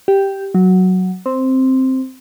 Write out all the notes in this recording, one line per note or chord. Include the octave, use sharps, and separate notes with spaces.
G4
F#3
C4